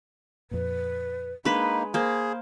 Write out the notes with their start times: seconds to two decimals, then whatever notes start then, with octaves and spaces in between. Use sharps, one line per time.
0.51 F2 A#2 B4
1.45 G#3 A#3 D4 D#4 B4 B5
1.94 A#3 G#4 C5 B5